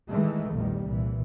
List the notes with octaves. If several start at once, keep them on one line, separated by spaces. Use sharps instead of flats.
D#3 E3 G#3 A3
A#1 E2 D#3 G3
C2 A#2 E3